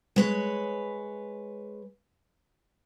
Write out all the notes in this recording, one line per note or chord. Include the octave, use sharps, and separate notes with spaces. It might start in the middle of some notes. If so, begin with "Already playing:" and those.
G#3 B4 C#5